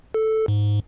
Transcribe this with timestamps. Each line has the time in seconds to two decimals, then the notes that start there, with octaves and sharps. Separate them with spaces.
0.14 A4
0.48 G#2